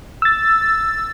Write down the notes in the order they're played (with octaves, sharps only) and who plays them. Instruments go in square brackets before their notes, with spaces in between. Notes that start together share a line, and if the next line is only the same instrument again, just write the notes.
[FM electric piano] E6 A6